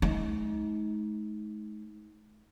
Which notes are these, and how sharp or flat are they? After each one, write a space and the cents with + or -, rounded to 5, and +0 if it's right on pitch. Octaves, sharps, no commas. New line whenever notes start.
G#3 +45 D#4 +25